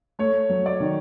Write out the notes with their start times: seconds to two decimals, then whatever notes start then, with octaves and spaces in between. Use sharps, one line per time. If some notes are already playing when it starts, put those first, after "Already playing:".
0.19 A3 C#5
0.49 F#3
0.66 D5
0.80 D#3